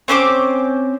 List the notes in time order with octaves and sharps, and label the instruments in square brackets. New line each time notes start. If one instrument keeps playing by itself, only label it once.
[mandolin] C4 C#4 C5 D6